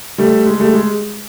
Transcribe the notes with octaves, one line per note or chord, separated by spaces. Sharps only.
G3 A3
G#3
G3 A3
G#3